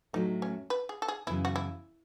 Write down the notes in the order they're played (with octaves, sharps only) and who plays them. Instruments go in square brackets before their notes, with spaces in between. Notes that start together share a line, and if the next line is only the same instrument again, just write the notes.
[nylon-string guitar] A2 F#3 A3 [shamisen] D#4
[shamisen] C#4
B4
G#4
A4
G#4
[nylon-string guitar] F#2 C#3 E3 B3 [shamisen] E4
[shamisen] F#4
E4